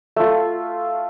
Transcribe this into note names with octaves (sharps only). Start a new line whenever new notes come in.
A3 F4